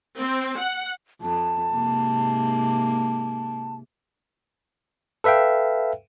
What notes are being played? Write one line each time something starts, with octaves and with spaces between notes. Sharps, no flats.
C4
F#5
F2 A5
G#2 C3 A#3
A4 B4 E5 F5 G5